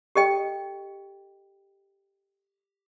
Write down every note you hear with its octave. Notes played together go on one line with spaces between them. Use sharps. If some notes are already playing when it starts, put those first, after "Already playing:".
G4 A4 D#5 G5